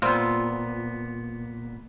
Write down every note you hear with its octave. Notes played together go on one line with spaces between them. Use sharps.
A#2 G3 B3 C4 F4